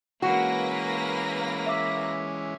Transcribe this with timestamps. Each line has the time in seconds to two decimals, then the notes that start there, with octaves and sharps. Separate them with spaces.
0.22 E3 G#3 A#3 C#4 F#4 B4 A#6
1.67 E5 D6